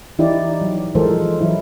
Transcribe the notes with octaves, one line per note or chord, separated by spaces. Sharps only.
E3 D#4 E4 G4 D5
F#3
E3 F3 G#3 A4 A#4 C5
E3 F#3 E4